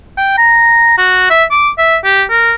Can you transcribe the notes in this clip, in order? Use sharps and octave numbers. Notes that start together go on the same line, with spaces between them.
G5
A#5
F#4
E5
D6
E5
G4
A#4